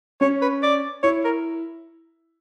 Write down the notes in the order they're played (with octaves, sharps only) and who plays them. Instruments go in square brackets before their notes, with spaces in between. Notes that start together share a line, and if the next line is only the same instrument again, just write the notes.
[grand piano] C#4 [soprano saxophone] C#5
[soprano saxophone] B4
D5
[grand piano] E4 [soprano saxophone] C#5
[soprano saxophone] A#4